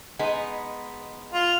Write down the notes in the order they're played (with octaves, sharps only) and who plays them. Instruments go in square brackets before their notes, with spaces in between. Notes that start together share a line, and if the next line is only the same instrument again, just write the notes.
[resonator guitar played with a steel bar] G#3 B3 D#4
[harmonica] F4